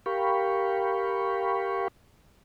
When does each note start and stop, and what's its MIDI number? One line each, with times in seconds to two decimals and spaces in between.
0.06 1.88 67
0.06 1.88 70
0.06 1.88 77
0.06 1.88 79
0.06 1.88 83
0.06 1.88 85